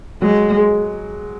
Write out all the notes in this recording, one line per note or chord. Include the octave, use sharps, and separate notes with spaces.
F#3 G#3
G#3